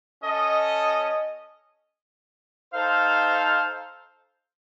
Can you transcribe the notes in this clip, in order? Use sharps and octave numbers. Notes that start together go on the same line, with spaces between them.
C#4 A4 D#5
D#4 A4 C5 F5